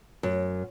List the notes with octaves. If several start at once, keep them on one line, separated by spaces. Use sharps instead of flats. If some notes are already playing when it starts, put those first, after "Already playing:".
F#2